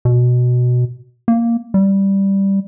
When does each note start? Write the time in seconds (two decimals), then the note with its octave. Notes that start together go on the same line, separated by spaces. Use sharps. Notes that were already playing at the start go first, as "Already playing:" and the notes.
0.05 B2
1.28 A#3
1.74 G3